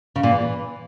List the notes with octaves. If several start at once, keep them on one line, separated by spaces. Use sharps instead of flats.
C#3
A#2
E3